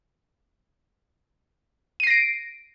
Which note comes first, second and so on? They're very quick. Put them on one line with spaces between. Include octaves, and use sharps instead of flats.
D#7 C7 A#6 D7